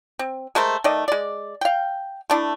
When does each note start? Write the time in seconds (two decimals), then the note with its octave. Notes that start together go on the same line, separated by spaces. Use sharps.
0.19 C4
0.55 G#3 A3 A#4 C5
0.84 D#3 A3 D5 D#5
1.08 G#3 D5
1.61 F5 G5
2.30 A3 D4 E4